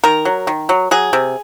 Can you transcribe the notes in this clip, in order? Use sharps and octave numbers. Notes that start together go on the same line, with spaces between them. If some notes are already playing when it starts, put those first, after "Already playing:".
D#3 A#4
F#3
D#3
F#3
F#3 G#4
C3